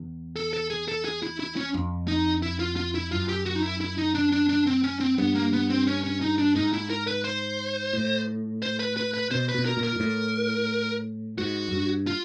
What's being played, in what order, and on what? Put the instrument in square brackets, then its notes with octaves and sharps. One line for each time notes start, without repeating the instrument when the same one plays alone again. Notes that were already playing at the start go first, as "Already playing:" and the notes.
Already playing: [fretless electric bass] E2
[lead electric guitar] A4
A4
G#4
A4
G#4
E4
E4
C#4
[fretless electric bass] F2
[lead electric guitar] D#4
E4
F4
F4
E4
[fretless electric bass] F#2 [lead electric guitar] F4
[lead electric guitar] G4
F#4
D#4
E4
E4
D#4
D4
D4
D4
C4
C#4
C4
[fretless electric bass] G2 [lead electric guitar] B3
[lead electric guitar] A#3
B3
C4
C#4
C#4
D#4
D4
[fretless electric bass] G#2 [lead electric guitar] D#4
[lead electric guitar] E4
A#4
B4
C5
[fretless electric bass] A2
[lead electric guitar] C5
B4
B4
B4
[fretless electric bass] B2 [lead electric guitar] C5
[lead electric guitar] B4
[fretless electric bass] B2
[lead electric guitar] A#4
[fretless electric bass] A#2
[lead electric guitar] A#4
[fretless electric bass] G#2
A2
[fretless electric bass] G#2 [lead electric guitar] F#4
[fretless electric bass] F#2
G2
[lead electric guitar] F4